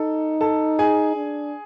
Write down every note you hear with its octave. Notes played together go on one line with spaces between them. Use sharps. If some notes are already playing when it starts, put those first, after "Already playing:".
Already playing: D#4 A4
A4 A5
G#4 G#5
D4